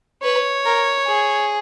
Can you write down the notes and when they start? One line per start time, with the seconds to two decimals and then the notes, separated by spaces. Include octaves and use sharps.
0.23 B4 C#5
0.65 A#4
1.07 G#4